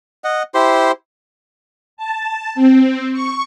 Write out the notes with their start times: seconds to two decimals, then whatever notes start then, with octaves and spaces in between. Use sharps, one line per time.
0.24 D#5 F#5
0.54 E4 G4 C5 C6
1.97 A5
2.55 C4
3.13 C#6